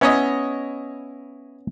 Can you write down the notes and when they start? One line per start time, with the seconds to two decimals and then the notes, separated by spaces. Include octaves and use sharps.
0.01 B3 C#4 E4 C#5 D#5